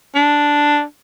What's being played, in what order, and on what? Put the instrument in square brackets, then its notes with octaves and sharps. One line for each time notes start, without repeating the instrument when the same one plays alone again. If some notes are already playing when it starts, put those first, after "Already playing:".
[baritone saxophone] D4